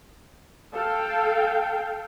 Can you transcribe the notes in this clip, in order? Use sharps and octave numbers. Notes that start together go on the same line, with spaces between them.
A4 F5 G5